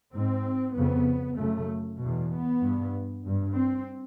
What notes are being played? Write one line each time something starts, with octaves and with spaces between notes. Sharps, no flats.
G#2 C4
F2 C#3 B3
F#2 C#3 A3
E2 B2
B3
G2
G2
C4